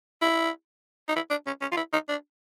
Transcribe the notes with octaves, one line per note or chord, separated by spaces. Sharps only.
E4
D#4
E4
D4
C#4
C#4
F4
E4
D#4
D4